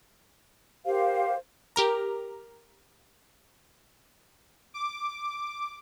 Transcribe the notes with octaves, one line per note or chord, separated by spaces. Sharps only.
G4 A#4 C5 F5
G4 A#4 A#5
D6